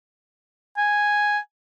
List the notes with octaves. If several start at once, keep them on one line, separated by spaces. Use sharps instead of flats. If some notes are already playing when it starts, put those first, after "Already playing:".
G#5